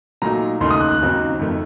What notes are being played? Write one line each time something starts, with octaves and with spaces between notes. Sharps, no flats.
A#2 F#3 A3 D#4 A#5
D#2 C#3 A3 D#4 C6
D#6
F#6
F#6
D#2 C#3 F#3 C4 D#4
F2 D#3 A3